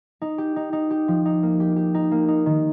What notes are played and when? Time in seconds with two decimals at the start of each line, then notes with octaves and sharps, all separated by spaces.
0.21 D#4
0.38 G4
0.56 D#4
0.73 D#4
0.90 G4
1.08 F3
1.26 D#4
1.43 A#3
1.60 G4
1.76 G4
1.94 D#4
2.11 A#3
2.28 D#4
2.46 D#3